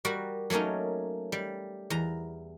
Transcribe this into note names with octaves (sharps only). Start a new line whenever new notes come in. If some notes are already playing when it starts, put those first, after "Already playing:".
G3 F#4 A#4
F#3 A3 A#3 C#4 D#4
G3
E2 A#5